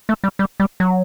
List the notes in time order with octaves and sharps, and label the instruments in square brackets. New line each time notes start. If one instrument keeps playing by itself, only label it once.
[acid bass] A3
G3
G3
G3
F#3